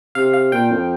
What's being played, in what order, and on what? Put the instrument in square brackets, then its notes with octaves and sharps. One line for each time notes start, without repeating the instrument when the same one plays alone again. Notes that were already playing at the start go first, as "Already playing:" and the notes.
[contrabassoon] C3 [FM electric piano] F5
[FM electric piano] F5
[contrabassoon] A#2 [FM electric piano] G5
[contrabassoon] F2